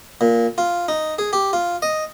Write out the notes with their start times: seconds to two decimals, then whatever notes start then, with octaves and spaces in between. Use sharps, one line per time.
0.21 A#2
0.58 F4
0.88 D#4
1.18 G#4
1.33 G4
1.53 F4
1.82 D#5